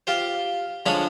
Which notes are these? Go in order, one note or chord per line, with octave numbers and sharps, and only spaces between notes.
F4 G4 C5
D3 F3 G#3 D4 C#5 B5